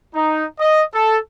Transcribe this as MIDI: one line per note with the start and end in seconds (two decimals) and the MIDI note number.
0.15 0.45 63
0.59 0.82 75
0.94 1.18 69